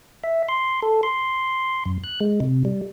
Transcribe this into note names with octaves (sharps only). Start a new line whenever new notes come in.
E5
C6
A4
C6
F#2
F#6
G#3
C3
G3